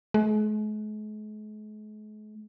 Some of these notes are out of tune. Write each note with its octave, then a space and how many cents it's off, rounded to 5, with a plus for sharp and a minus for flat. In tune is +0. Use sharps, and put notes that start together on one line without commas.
G#3 +45